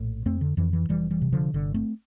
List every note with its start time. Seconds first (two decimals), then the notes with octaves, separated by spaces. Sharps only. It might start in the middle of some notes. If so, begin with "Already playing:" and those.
Already playing: A#1 A2
0.25 F2 A3 C4
0.41 D3
0.57 F2 E3
0.73 E3
0.89 F1 E3 G3
1.11 E3 G3
1.22 C3
1.33 D3 F3
1.54 G1 D3
1.74 A3 C4